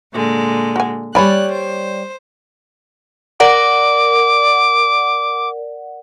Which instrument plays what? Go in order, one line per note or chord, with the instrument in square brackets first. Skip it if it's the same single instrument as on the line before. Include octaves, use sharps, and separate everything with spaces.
[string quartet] A#2 D3 G#3
[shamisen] F#4 G#5
[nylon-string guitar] G3 C#5 D5 [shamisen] G#5 B5 [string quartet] F#6
[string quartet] C5
[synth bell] A#4 D5 F#5 [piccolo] D6